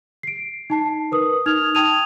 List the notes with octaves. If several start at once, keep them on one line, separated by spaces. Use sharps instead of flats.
C7 D7
D#4 A5 C7
A#4 B4 D#6
D#4 D#6 F6 G#6 F7
G5 A5 D#6 G#6 D#7 F7